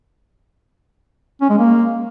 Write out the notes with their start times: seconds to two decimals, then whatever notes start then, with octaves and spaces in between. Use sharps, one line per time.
1.41 C#4
1.50 G#3
1.58 A#3